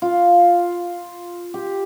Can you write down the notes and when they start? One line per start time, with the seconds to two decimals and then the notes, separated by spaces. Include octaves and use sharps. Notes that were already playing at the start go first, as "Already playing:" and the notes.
0.02 F4
1.54 G4